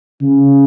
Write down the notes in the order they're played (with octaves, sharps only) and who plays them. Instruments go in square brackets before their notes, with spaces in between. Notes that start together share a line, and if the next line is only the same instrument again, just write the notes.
[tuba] C#3